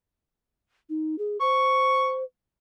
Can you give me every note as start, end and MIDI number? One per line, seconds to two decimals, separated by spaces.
0.89 1.16 63
1.19 1.40 68
1.41 2.24 72
1.41 2.16 85